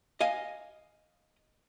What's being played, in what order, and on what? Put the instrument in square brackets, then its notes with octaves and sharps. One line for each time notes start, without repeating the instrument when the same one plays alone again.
[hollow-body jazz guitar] D#5 F5 G#5